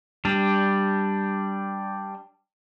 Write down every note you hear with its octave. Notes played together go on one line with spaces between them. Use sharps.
G3 D4